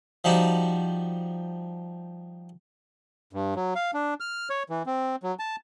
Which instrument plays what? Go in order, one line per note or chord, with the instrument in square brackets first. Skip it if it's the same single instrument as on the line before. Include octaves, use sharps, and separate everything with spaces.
[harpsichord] F3 G3 D#4 F#4
[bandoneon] G2
F#3
F5
D4
F6
C#5
E3
C4
F#3
A5